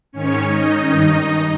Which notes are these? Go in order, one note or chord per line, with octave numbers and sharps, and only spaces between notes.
G#2 D#3 C#4 C#5
D#4 D#5
G2 D#3